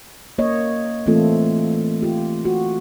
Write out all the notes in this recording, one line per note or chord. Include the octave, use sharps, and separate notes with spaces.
A#3 C#5 D#5
E3 A3 A#3 C4 F4 A4
F4 G4
F#4